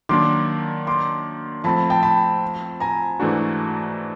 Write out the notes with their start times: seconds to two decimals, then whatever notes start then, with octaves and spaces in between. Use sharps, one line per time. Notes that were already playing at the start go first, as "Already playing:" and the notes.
0.09 D#3 F#3 A#3 D4 C6 D6
0.87 C6 D6
1.64 F3 A3 C4 A5 B5
1.90 G5 A5
2.03 A5 B5
2.80 G#5 A#5
3.20 G#2 E3 A3 D4 F#4